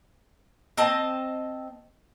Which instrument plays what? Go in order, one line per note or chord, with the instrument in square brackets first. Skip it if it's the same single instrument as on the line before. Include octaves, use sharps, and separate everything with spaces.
[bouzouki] C4 D#5 A5